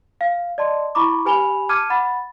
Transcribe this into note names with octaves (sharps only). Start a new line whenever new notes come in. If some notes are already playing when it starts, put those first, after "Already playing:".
F5
D5 D#5 A5 C6
E4 A#5 B5 C#6 D6
G4 B4 G#5 B5 F7 G7
A5 D6 F6 G#6 C#7 D#7
F#5 B5 A6